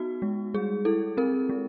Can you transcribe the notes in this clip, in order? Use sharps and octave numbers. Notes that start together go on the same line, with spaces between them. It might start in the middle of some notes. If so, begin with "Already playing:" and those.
Already playing: B3 D#4 F#4
G#3
G3 G#4
E4 A4
C4 A#4
G#3